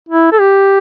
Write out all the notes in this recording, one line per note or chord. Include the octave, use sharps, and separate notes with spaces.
E4
A4
G4